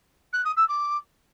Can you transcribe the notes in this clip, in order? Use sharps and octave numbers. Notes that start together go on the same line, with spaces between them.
F#6
D#6
E6
D6